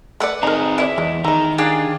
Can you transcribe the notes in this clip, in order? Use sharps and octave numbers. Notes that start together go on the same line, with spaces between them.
A3 B4 D5 F#5
C4 D#4 G#4 A#4 A#5
E4 B4 C#5 D5 E5
E2 G#3
D#3 E3 G#3 A#5
D4 F4 G4 G#4